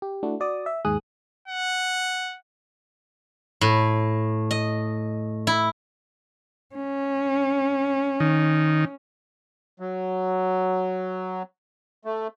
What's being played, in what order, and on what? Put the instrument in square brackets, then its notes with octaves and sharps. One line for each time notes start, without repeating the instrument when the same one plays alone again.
[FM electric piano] G4
A3 D4 E4 F#4
F#4 D5 D#6
E5
D#2 G#2 G#4 D#6 F#6
[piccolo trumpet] F#5
[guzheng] A2
D#5
E4
[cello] C#4
[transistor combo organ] D#3
[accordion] F#3
A3